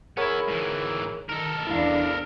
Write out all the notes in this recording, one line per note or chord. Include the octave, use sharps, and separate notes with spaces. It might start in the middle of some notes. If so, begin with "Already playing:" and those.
B3 E4 G#4 A#4 C#5
G#2 E3
D#3 A4 A#4
E2 D4 E4 F5